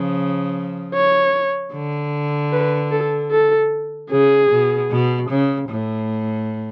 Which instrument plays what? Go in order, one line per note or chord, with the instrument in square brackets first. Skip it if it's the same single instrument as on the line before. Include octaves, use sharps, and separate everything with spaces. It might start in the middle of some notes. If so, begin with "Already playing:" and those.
Already playing: [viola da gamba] C#3 F3
[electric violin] C#5
[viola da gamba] D3
[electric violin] B4
A4
A4
[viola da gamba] C#3 [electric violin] G#4
[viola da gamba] B2
B2
C#3
A2